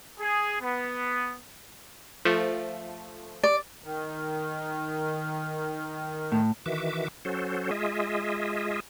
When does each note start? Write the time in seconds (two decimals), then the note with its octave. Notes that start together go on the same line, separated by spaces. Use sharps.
0.19 G#4
0.60 B3
2.25 F3 A3
3.44 D5
3.84 D#3
6.32 A2
6.66 D#3 E3 F#4 E5 D6
7.25 F#3 C#4 F#4 A4 C5
7.71 G#3 F4 G#4 D#5 E5